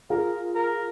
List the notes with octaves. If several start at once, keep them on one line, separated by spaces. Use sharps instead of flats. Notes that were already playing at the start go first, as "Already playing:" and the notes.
F4 G#4 A#4
A#4